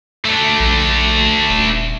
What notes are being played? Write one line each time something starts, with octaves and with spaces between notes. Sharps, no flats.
A3 D4
A#1
D#1